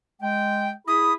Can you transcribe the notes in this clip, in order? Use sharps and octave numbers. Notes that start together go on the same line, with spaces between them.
G#3 G5
E4 G#4 B5 D#6